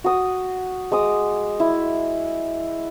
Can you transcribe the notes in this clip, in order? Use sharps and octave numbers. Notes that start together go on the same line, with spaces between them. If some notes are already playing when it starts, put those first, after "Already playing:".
F#4 D#6
G#3 D6 D#6
E4